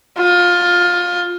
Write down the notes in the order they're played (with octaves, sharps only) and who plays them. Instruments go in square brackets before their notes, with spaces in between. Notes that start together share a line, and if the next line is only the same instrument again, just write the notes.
[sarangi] F4